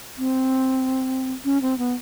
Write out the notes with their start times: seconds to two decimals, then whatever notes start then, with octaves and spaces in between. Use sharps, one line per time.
0.18 C4
1.45 C#4
1.62 C4
1.78 B3